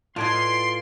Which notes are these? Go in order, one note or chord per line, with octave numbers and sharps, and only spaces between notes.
A2 F4 B4 D5 D#5 G#5 C6